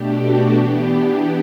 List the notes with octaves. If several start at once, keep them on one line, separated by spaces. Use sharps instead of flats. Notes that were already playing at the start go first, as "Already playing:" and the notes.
Already playing: B2 A3 D4 G4
F#4
E3 B3 D4 G4